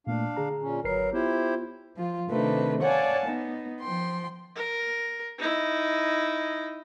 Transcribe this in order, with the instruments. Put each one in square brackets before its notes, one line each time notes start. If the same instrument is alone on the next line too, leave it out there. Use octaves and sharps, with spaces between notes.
[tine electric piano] A#2 A3 A#3 [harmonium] D4 F5
[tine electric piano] D3 G#4 A#5
[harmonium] A#2 C#4
[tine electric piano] G#1 B4 C7 [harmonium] F#3 A#4
[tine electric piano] B3 F4 [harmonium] E4 G4 C5
[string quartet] F3 F4
C3 D#3 A3 C4 D4 B4
C#5 D5 F5 F#5 G#5 A5
B3 D#4
F3 G5 C6
[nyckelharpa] A#4
D#4 E4